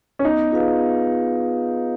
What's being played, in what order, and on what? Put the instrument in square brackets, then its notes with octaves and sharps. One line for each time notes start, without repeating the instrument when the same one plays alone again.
[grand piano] C#4
[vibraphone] B3 [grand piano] D#4
[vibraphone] F4 G#4 B4 F5
B3